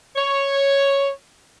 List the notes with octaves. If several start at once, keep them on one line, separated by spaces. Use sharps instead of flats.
C#5